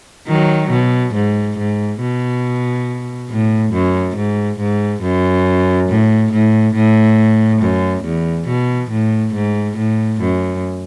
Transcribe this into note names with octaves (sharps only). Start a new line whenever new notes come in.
D#3 F#3
B2
G#2
G#2
B2
A2
F#2
G#2
G#2
F#2
A2
A2
A2
F#2
E2
B2
A2
G#2
A2
F#2